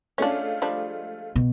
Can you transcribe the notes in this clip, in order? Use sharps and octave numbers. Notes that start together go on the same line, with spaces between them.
G#3 A3 C#4 D4 F4
F3 G3 D4
B2